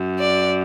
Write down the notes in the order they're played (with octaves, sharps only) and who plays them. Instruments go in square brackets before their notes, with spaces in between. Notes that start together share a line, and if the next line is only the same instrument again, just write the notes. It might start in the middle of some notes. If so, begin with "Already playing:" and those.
Already playing: [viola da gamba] F#2
[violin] D5